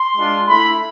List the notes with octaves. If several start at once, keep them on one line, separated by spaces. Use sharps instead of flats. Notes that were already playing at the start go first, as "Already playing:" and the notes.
Already playing: C6
G#3 D4 F4
A3 E4 B5